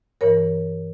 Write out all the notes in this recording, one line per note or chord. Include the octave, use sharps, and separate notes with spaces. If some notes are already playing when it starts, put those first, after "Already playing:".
G2 E3 A#4 C#5